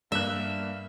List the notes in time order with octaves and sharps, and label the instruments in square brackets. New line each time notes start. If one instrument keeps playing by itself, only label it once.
[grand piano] G2 F#6 [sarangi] A#3 [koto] E5